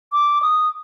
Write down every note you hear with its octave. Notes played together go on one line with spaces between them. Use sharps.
D6
D#6